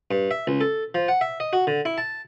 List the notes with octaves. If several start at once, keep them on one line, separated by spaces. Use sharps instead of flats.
G2
E5
C#2
A4
F3
F#5
E5
D#5
F#4
D3
E4
A5